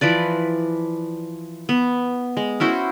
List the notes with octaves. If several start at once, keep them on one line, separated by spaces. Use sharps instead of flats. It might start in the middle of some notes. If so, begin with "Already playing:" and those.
E3 F3 B4 D5
B3
G#3
C#4 E4 F#4 C5